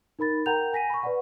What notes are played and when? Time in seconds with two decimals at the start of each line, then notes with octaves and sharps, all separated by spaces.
0.19 D#4 A#4 B5 A6
0.46 A#4 F#5 G5 A#5 G6 F7
0.73 G#5 A#6 B6 D#7
0.90 B5 C#6
1.03 B4 D5 F#5